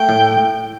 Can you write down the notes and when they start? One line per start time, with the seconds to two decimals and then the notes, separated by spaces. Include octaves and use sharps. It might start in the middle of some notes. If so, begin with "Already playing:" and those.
Already playing: A3 G5
0.09 A2